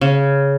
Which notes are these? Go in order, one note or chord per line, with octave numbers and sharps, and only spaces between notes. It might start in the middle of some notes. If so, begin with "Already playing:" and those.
C#3